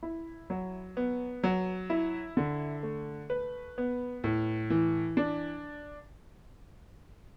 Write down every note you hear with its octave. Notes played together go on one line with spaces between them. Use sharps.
E4
F#3
B3
F#3
E4
D3
A3
B4
B3
A2
E3
D4